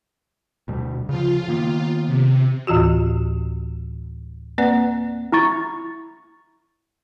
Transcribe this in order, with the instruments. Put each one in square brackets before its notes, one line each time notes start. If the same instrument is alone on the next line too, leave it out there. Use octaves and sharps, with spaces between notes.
[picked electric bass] D2 B2 G3
[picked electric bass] C#3 F3 [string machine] F4
[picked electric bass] D#3 A#3 B3
[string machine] C3
[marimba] D2 A2 E3 F4 F#4
A#3 C4 B4 D5 F#5 F#6
[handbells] E4 A#5 C#6 A6